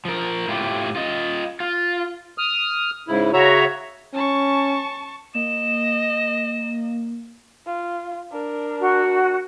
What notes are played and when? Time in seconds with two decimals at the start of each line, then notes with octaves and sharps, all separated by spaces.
0.05 F3 A#4
0.48 A2 E4 F4 G4
0.96 F4 D#5
1.60 F4
2.38 D#6 F6
3.08 G#2 C#3 E4
3.33 C#3 F#4 C#5 E5 A#5
4.14 C#4 A5 C#6
5.34 A#3 D#5 E7
7.66 F4
8.32 D4 A#4
8.79 F#4